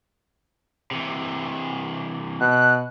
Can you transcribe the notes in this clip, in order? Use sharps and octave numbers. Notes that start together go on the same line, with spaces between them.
C3 E3
B2 F#6